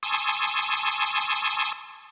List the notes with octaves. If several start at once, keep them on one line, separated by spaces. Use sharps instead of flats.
G#5 A5 C6 C#6 D#6 E6